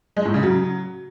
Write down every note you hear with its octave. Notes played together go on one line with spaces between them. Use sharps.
G#3
A2
C#3
F#3